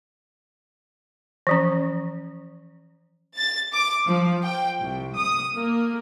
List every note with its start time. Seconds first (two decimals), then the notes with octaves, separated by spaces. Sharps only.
1.47 E3 F3 C#4
3.36 A6
3.73 D6
4.06 F3
4.44 G5
4.81 C2
5.16 D#6
5.54 A#3